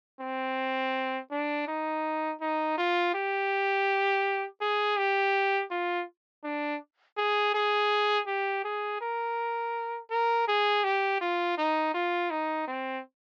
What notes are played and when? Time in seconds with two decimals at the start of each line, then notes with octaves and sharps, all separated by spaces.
0.21 C4
1.31 D4
1.68 D#4
2.41 D#4
2.78 F4
3.14 G4
4.61 G#4
4.97 G4
5.71 F4
6.44 D4
7.17 G#4
7.55 G#4
8.27 G4
8.65 G#4
9.01 A#4
10.10 A#4
10.48 G#4
10.84 G4
11.21 F4
11.58 D#4
11.94 F4
12.30 D#4
12.68 C4